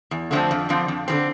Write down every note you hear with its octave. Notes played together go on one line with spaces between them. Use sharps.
E2
D3 F3 A3 C4
F2
D3 F3 C4
F2
D3 F3 C4